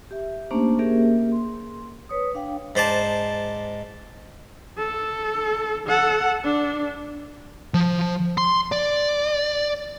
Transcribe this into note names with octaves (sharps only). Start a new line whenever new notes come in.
G4 E5
A3 A#3 C#4 D4 G4 C5
A#3 C#4 G4 G#4 A#4 E5
C6
B4 C#5 D#6
D4 F5 G5
G#2 C5 D5 A5
A4
A4 F#5
D4
F3
C6
D5